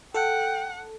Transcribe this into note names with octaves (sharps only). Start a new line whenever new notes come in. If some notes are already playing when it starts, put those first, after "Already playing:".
A4 F#5 G5